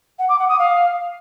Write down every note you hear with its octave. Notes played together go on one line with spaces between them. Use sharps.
F#5
D6
F#5
D#6
F5